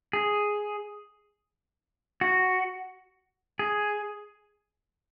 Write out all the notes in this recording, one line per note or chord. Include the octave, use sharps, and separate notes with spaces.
G#4
F#4
G#4